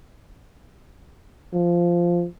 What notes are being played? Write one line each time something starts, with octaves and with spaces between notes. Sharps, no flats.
F3